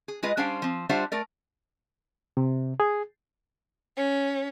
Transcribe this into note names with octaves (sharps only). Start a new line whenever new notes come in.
G#4
G#3 F4 G#4 B4 D#5
G3 C#4 D4 C5 F5 G5
F3 C4
G3 D4 F4 C5 E5 F#5
A3 A#4 D5
C3
G#4
C#4